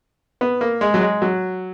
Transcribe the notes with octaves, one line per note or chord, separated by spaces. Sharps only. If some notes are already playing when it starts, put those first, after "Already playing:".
B3
A#3
G#3
F#3
G#3
F#3